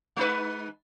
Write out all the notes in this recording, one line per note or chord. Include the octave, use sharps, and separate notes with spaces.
G#3 D#4 B4